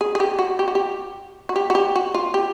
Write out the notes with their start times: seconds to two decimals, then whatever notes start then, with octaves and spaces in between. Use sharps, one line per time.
0.01 G#4
0.15 G#4
0.20 G4
0.39 F#4
0.59 G4
0.68 F#4
0.75 G4
1.49 F#4
1.56 G4
1.70 F#4
1.75 G4
1.96 F#4
2.15 F4
2.34 G4